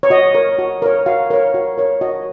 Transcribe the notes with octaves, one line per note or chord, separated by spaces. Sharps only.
C#5
F#4 D#5
A#4 C#5
F#4
A#4 C#5
F#4 F5
A#4 C#5
F#4
A#4 C#5
F#4 D#5